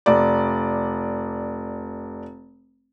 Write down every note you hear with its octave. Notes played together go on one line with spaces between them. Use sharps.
F1 D5